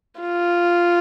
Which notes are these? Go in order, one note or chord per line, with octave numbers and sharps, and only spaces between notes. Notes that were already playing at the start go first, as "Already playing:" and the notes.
F4